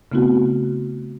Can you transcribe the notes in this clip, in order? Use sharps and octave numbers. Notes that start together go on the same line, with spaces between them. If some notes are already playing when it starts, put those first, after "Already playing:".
C#3 A3 B3 C4 E4 F#4